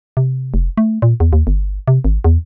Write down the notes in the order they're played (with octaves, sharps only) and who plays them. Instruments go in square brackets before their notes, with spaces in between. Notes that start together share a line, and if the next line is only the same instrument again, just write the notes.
[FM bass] C3
F1
A3
A#2
E2
D#2
G1
C3
G#1
E2